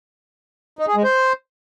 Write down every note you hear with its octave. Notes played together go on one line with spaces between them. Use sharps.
D#4
G#4
G#3
C5